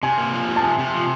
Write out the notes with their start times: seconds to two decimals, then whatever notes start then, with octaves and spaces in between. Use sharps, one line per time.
0.03 C3 G#5
0.18 A#3
0.33 F3
0.48 C3
0.56 A5
0.63 C3 G#5
0.79 C3
0.94 F3